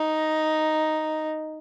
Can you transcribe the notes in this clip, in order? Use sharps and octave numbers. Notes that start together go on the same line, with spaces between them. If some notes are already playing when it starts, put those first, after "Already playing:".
Already playing: D#4